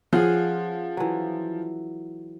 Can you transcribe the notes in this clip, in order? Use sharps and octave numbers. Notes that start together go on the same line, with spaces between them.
F3 C#4 F4 G#4 F#5
E3 F#3